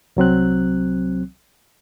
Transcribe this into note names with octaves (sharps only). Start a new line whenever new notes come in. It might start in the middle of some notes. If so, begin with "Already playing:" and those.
C2 F#3 C4 F#6